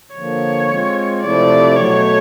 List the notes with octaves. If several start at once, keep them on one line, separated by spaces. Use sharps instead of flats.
D3 F3 A#3 C#5
G#3 C4 F4
C3 F3 A3 C4 E4 D5
B2 F#3 A3 C#5